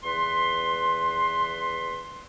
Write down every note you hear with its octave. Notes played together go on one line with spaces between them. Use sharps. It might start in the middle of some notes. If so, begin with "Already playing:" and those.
E2 B4 C6